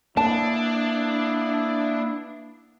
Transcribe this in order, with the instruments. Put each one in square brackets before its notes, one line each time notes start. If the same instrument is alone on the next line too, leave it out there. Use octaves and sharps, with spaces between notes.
[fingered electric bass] A#3 [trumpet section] B3 E4 [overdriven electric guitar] D4 [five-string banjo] A5